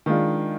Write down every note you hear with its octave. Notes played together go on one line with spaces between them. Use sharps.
D#3 G#3 D4 F4